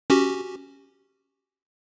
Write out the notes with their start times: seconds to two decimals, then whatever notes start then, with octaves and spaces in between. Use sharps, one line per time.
0.10 C#4 F#4 G4